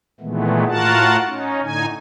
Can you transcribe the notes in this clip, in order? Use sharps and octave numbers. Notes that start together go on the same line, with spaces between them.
A#2 D#3 E3 G#3 A3 B3
A2 F4 F#4 A#4 F#5 A5
C#4 D#4
A2 D3 D#4 G#5